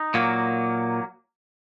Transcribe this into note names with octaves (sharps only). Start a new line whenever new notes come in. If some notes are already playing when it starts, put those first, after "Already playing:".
Already playing: D#4
A#2 F#3 A#3